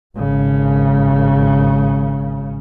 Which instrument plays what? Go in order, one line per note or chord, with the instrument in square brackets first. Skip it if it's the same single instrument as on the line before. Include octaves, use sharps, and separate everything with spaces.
[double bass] G#1 C#3